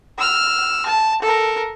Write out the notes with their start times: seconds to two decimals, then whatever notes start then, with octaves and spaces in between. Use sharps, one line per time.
0.18 E6 F6
0.86 A5
1.22 A4 A#4